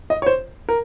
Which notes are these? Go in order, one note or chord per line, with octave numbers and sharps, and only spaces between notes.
D#5
C#5
C5
A#4